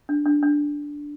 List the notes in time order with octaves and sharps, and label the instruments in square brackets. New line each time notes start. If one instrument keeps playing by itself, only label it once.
[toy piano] D4
D4
D4